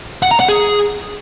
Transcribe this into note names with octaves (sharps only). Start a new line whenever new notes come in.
F#5
A#5
F#5
G#4